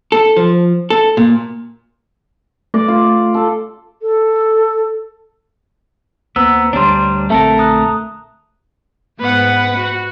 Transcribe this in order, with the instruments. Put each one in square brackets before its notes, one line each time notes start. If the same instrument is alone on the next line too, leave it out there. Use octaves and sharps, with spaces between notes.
[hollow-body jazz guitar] A4
F3
A4
A#2
[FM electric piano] A3 [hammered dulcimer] D5
[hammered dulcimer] F4
A4
[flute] A4
[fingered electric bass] D#2 A#3 [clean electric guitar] B3 [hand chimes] C5 A#5 [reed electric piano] E6
[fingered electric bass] D2 [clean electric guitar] G3 D4 [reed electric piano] C#5 C6
[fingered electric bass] A#1 D3 C4 [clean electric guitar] A3 A4 A#4 [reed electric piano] E5 A5
[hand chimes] A#5 D#6 F#6
[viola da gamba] G#2 B3 [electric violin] B4 F#5
[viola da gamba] F#4